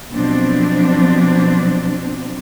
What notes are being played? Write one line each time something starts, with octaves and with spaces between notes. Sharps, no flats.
B2 F3 F#3 C4 D4